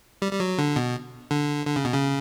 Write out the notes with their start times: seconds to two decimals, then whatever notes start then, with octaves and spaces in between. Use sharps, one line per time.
0.22 G3
0.33 G3
0.40 F#3
0.58 D3
0.76 B2
1.31 D3
1.67 D3
1.76 C#3
1.85 B2
1.94 C#3